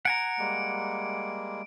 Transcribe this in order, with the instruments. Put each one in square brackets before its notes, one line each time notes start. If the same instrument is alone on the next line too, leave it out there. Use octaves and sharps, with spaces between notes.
[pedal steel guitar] F#5 G#5 A#5 [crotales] D7
[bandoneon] G3 G#3 A#3